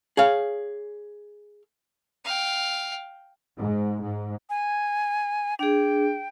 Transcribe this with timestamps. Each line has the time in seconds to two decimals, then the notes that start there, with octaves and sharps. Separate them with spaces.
0.17 G#4 C#5 F5
2.25 F5 G5
3.58 G#2
4.02 G#2
4.50 G#5
5.59 D4 G#4 G5